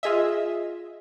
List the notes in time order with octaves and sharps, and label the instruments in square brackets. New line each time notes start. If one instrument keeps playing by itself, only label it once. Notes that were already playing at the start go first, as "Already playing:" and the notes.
[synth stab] F4 G#4 D#5 E5